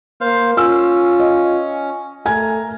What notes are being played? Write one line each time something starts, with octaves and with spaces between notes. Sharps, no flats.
A#3 C5 F5
C#4 F4 E6
D#5
A3 A#4 G#5 G#6